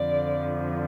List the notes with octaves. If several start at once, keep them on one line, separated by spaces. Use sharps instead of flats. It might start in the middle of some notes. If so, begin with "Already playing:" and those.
Already playing: F2 D3 F3 D5